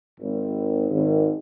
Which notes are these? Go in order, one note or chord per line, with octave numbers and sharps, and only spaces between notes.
G#1
G#1